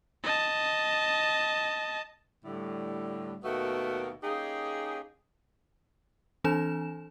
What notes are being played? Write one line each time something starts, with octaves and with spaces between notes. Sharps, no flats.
D#5 A5
A2 D3 G3
D#2 B2 A3 B3 F#4 A#4
A#3 C#4 D#4 G4 G#4
E3 C4 D4 A4 G#5 E7